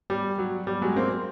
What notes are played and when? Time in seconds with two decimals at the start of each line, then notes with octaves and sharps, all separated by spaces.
0.10 G3
0.38 F#3
0.67 G3
0.82 F#3 G#3
0.96 A#3 C4